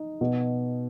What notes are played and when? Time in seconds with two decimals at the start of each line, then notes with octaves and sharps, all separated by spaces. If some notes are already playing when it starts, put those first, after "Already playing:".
Already playing: D#4
0.21 B2